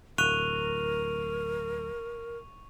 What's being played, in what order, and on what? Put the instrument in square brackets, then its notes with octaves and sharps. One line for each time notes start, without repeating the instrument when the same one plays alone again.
[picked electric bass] D1 [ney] A#4 [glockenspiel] C#6 D#7 F7 [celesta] F#6